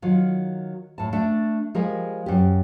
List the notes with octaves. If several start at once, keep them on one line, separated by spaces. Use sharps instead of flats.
D#3 F#3 F4
A2 A5
A3 D4 D5
F3 G3 G#3 A#4
F#2 G4